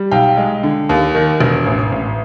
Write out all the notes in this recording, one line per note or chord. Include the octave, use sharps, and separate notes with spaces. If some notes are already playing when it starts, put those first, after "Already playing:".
Already playing: G3
B1 F5 G5
G#3
D3
D#2
D#3
E1
A1
A1